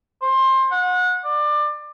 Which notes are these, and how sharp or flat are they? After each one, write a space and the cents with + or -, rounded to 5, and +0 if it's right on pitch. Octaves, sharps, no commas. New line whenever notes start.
C5 +20
F#5 -30
D5 +25